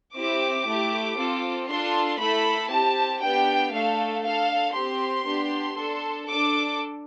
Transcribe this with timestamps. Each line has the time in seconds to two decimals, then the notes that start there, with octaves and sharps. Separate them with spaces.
0.16 C4 E4 G4 D6
0.67 A3 E4 G4
1.18 C4 F4 A4
1.69 D4 F4 A4 C6
2.20 A3 E4 A4 B5
2.71 C4 G4 A5
3.22 B3 D4 G4 G5
3.73 A3 D4 A4 F5
4.24 D4 A4 F5
4.75 C4 G4 C6
5.26 B3 D4 G4
5.78 D4 A4
6.29 D4 A4 D6